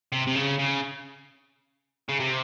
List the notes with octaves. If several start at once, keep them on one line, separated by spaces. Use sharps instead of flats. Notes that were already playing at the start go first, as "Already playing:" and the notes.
C3
C3
C#3
C#3
C#3
C3